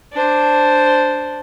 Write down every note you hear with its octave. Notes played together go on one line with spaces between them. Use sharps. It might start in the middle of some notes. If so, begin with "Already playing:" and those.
D4 C5